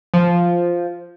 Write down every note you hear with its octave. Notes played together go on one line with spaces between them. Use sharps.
F3